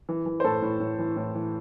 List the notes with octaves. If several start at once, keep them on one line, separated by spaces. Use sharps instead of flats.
E3
E3
C5
A2 A4
A2
A2
E3
A2
E3